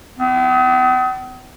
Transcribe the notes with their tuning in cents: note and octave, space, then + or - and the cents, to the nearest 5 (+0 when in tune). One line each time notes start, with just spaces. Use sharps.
B3 +45